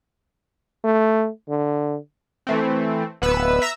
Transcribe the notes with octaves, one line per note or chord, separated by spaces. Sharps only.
A3
D3
E3 A3 C4
D1 B3 B4 E6
E5 A#5 E6